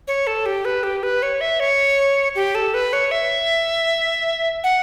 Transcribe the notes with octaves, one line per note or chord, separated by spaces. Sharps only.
C#5
A4
G4
B4
G4
B4
C#5
E5
C#5
G4
A4
B4
C#5
E5
F#5